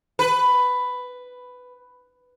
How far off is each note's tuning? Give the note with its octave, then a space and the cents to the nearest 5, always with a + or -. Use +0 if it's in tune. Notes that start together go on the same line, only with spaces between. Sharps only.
B4 +10